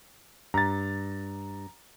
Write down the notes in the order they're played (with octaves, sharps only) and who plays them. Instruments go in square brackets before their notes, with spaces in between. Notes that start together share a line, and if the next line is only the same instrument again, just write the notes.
[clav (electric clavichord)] G2 [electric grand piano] A#5 A6